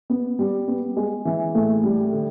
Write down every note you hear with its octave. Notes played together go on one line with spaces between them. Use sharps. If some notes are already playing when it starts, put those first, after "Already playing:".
B3
G3
B3
G#3
E3
A2
G3
D3